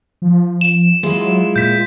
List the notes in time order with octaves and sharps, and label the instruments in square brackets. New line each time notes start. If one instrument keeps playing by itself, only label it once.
[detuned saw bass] F3
[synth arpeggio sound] E7
[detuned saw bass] F#3 [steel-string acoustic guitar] G#3 E4 F4
[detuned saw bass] A#2 [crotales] G6 B6